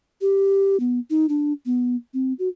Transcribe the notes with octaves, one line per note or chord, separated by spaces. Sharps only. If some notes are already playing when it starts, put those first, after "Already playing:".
G4
B3
D#4
D4
B3
C4
F#4